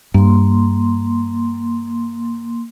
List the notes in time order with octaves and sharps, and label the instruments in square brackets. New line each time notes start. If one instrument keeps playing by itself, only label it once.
[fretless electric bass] G2 [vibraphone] A#3 C6